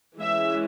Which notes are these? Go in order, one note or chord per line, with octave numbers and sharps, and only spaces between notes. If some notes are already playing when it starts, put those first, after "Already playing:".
E3 G#3 C#4 E5